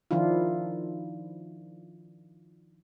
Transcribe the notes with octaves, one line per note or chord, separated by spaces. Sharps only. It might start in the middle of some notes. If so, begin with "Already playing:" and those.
D#3 F3 D4 E4 F4